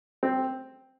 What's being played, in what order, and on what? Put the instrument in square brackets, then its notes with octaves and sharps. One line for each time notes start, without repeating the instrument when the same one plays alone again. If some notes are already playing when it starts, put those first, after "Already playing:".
[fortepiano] C4